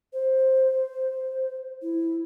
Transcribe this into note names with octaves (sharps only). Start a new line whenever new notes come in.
C5
E4